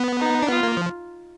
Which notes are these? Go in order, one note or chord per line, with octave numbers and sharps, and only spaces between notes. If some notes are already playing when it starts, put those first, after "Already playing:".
Already playing: B3
D#4
D4
B3 F4
A#3
F3